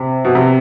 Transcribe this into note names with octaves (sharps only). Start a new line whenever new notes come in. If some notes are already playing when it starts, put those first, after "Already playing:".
Already playing: C3
B2
C3